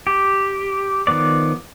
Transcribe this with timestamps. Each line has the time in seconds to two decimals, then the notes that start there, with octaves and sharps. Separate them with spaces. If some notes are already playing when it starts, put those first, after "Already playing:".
0.07 G4
1.07 D#3 F3 B3 D5